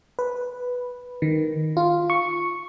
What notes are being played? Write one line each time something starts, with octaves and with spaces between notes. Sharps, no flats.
B4
D#3
F4
C#6